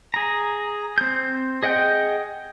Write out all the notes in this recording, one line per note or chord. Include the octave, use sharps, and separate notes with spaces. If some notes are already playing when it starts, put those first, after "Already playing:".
G#4 A#5
C4 G6
G#4 D#5 F#5 G5 G6